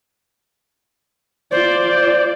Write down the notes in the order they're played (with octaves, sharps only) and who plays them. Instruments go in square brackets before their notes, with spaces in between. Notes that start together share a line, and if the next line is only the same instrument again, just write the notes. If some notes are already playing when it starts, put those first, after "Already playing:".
[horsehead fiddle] F4 D5 [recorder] C5